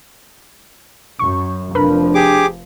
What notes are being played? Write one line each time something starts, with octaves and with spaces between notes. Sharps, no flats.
F#2 C#6
F1 F3 D4 A#4 B4 B5
G4 G#4 D6